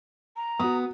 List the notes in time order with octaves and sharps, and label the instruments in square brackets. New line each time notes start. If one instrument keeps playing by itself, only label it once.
[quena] A#5
[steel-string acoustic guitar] B3 [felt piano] F#4 D#6